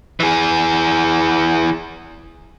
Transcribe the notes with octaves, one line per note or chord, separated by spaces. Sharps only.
E3 G#4